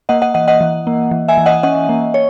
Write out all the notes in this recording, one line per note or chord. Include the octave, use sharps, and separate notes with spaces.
A#3 D#5 F#5
D#5 F#5
E3 D#5 F#5
D#5 F#5
E3
A#3
E3
E5 G#5
E3
D#5 F#5
C#4 D#5 F#5
A#3
C#5